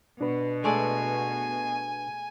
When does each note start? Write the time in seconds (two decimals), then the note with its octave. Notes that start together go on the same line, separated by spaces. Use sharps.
0.21 B2 D4 B4
0.64 G#3 A3 D5 G#5